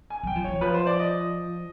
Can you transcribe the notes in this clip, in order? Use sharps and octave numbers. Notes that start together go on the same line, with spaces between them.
G#5
F#3 G5
F3
E3 C#5
F3 B4
C5
D5
D#5